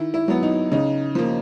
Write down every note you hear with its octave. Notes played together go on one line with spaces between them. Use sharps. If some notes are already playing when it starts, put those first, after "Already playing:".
Already playing: D#3 E4
E4
F#3 B3
D#4
C#3 D#4
F3 A#3